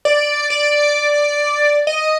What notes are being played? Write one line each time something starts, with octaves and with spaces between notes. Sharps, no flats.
D5
D5
D#5